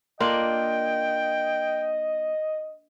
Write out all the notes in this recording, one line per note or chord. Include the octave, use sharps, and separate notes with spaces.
A#3 D4 F4 D#5 G5